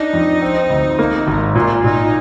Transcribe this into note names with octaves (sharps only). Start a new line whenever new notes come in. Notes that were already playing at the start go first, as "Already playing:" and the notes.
Already playing: D4 D#4
F2
C4
D2
A#3
G#1
A#2 F4
A#2 D#4